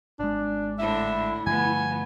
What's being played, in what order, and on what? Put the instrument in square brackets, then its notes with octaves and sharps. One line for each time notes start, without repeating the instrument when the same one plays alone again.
[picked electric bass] G#1 G#3 [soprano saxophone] D4
[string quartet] A2 D3 D4 [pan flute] E4 [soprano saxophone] E5
[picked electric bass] G2 D3 F3 [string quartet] A3 B3 [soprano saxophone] G#5